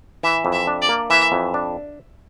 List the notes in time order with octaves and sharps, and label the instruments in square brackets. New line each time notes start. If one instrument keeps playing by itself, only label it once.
[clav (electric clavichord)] E3 [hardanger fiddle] E5
[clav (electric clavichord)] F2
[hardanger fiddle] E5
[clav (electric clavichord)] D4
[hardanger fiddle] D5
[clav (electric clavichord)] A#3
[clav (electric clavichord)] E3 [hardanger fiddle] E5
[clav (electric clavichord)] F2
D4